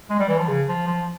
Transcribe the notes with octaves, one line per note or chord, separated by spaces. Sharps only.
G#3
G3
E3
F3
C#3
F3
F3